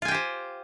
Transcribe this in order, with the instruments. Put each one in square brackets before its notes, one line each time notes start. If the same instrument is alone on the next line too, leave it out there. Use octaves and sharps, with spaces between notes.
[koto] F4
G#5
G5
G4
C5